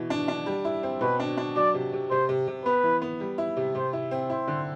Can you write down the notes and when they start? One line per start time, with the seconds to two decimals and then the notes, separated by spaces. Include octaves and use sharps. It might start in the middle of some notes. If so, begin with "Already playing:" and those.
Already playing: B2 E3
0.10 D4
0.28 D4
0.46 G3
0.65 E4
0.83 C4
1.01 B2 B4
1.20 D4
1.38 D4
1.56 F#3 D5
1.74 C3
1.93 C3
2.11 C3 C5
2.29 C3
2.48 C3
2.66 B3 B4
2.84 E3
3.02 B3
3.20 G3
3.38 E4
3.57 C3
3.75 C3 C5
3.93 E4
4.11 C4
4.30 E4 C5
4.48 D3